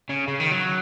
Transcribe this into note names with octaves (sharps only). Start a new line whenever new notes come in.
C#3
C#3
D#3
F#3